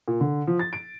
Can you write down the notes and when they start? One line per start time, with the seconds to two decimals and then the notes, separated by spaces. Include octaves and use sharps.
0.08 A#2
0.21 D3
0.47 F3
0.59 A6
0.73 D7